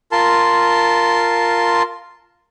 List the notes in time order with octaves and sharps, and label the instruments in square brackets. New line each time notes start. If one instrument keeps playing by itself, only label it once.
[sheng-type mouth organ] F4 A#4 A5 C6